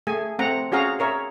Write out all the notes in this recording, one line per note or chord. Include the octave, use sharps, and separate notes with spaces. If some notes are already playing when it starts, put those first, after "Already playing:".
A3 G#4 G#5
A3 C4 F#5 A#5
C#4 F#4 G#4 F5 A#5
G#4 A#4 C#5 E5